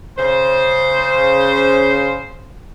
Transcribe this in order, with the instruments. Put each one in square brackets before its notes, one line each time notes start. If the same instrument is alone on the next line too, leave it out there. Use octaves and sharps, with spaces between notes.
[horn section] C#3 C5